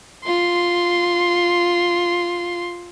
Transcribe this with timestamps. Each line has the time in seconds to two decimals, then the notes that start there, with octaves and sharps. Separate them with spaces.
0.24 F4 C6